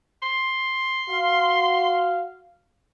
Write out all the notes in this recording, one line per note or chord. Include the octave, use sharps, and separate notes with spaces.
C6
F#4 F5